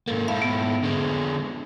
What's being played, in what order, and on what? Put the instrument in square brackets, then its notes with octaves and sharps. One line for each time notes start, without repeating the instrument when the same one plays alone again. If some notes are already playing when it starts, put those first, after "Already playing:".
[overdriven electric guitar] G#2 A#3 [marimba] A4
[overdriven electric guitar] G#2 E4 [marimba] F5 A5
[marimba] B3
[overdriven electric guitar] D3 G#3